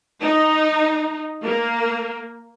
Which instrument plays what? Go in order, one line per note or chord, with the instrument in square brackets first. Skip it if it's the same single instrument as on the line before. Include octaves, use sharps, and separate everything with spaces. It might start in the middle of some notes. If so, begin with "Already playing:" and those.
[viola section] D#4
A#3